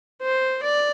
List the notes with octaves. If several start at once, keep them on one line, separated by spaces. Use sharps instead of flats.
C5
D5